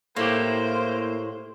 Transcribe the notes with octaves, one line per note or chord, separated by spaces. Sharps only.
A2 A#3 E4 G4 C5